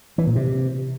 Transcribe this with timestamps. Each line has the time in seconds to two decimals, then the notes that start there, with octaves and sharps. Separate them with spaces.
0.18 E3
0.27 A#2
0.36 C3